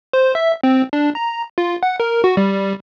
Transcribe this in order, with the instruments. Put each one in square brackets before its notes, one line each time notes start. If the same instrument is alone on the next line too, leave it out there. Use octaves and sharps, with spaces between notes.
[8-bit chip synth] C5
E5
C4
D4
A#5
F4
F#5
A#4
F#4
G3